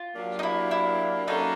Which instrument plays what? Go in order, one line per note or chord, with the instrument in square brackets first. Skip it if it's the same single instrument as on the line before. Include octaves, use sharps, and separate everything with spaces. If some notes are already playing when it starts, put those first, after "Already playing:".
Already playing: [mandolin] F4
[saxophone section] F#3 A#3 D4 G4 A#4
[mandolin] D#4
E4
E4
[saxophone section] F#3 A#3 C#4 F#4 A4 [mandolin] D#4